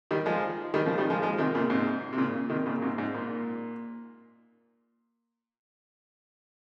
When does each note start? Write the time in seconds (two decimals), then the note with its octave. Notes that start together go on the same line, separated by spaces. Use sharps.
0.11 D#3 G3
0.26 F3 G#3
0.74 D#3 G3
0.86 C#3 F3
0.98 D#3 G3
1.10 F3 G#3
1.22 F3 G#3
1.38 C3 D#3
1.55 A#2 C#3
1.70 G#2 C3
2.13 C3
2.18 A#2 C#3
2.50 C3 D#3
2.66 A#2 C#3
2.82 G#2 C3
2.98 G#2
3.15 A#2